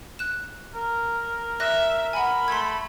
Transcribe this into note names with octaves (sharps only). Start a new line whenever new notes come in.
F#6 E7
A#4
E5 F#6 A#6
F#5 G#5 B5
A3 C6 G#6